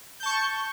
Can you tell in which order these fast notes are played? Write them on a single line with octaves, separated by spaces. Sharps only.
G6 A5 C#6